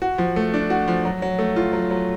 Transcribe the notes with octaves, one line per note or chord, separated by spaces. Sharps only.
F#4
F3
A3
D4
F#4
F3
F#3
F#3
A3
F4
F#3
F#3